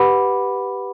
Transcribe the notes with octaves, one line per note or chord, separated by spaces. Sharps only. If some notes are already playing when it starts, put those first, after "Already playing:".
Already playing: G4 B4 F#5 B5 D6